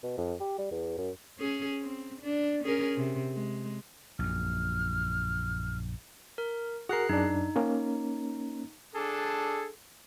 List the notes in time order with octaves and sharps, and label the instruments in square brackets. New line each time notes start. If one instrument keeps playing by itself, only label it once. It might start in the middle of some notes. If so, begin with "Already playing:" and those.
[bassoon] B2
F2
G4
G3
E2
F#2
[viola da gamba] C#4 G#4
C4
D4
C#4 G#4 A#4
C3
G#3
[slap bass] A#1 F#2 [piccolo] F6
[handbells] A#4
[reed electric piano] F#4 A#4 [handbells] G#4 F#6 C7
[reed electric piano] F#2 D4 [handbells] D#4
[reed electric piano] A#3 C#4
[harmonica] D4 G#4 A4